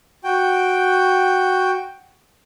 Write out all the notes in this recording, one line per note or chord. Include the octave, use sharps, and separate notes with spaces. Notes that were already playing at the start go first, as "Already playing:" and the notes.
F#4 G5